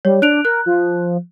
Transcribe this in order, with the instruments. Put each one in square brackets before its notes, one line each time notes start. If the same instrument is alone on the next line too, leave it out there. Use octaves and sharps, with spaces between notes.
[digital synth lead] G3 [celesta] C#5
[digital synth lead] D4 [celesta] F#6 D7 F7
[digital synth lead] A#4 [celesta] F#6
[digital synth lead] F3